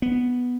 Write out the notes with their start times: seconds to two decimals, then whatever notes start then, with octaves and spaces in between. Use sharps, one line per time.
0.02 B3